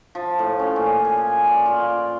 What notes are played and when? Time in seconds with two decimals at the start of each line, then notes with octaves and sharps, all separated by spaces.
0.15 F3
0.39 A2
0.59 C#4
0.76 A#2
1.05 G#5
1.47 D5
1.66 F4